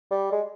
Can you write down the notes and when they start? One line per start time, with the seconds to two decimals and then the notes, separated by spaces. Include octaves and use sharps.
0.11 G3
0.32 G#3